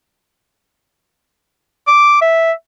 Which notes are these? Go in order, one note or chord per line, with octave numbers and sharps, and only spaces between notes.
D6
E5